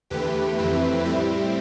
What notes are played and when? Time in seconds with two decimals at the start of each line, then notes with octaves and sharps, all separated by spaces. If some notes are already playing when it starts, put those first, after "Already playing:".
0.10 E2 D3 A3 G4 B4
0.58 F2 E3 A3 C4 E4
1.05 A2 G3 C4 E4 G4